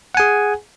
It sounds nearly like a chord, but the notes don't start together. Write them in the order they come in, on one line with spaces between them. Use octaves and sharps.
F#5 G#5 G#4